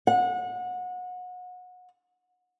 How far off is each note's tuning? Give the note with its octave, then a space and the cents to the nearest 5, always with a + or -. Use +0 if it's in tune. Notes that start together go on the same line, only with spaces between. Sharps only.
F#5 -30